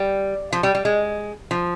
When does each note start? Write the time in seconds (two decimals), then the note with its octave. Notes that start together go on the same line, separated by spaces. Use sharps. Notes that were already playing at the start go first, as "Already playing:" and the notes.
Already playing: G3
0.53 F3
0.63 G3
0.75 G3
0.85 G#3
1.51 F3